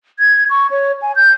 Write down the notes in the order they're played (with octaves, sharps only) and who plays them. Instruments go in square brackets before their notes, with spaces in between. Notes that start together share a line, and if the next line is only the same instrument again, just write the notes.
[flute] G#6
C#6
C#5
G#5
G6